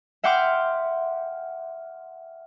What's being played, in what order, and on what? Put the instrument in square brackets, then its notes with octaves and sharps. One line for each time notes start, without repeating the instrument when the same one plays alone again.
[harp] E5 F#5 G5 C6 D6 F6